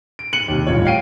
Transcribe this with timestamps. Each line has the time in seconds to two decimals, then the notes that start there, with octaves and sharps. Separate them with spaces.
0.19 D7
0.33 F#6 C#7 D#7 F#7
0.48 D#2 C3
0.67 D#1 A1 A2 F4 C#5
0.85 F5 G5 C7 D7 D#7